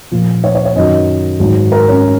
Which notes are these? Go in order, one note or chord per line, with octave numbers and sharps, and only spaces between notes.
A#2 F3
C#5
C#5
C#5
F#2 D#3 F#3 D#5
G#2 D#3 F#3
A#4
C#4